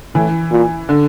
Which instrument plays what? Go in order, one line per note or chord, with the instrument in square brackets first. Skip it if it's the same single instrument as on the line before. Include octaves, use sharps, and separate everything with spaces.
[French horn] A2 [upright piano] E3
[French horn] A#2
[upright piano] D3